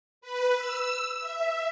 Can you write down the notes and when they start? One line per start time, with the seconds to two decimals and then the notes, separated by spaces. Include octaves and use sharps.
0.21 B4
0.55 E6
1.21 E5